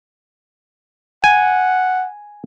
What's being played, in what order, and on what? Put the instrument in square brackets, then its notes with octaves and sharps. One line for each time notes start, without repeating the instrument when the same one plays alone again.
[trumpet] F#5 [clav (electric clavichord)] G#5